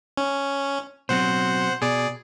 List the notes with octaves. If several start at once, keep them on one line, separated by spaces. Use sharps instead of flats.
C#4
B2 F#3 C4 C5 F#5
B2 G#4 D5